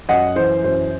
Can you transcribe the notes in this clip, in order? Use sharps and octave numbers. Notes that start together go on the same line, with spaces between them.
F#2 D#5 F#5
E3 C5
F#2 C5